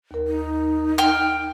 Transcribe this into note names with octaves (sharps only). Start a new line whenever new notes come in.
D#2 A#4
D#4
G5 F6